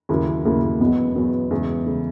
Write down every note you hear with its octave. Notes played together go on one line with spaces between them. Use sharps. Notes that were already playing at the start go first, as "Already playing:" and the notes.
D#2 C#3 F#3 A#3 E4
D#2 C#3 F#3 A#3 E4
E2 B2 F#3 B3
E2 B2 F#3 B3
E2 C#3 G#3
C#3 G#3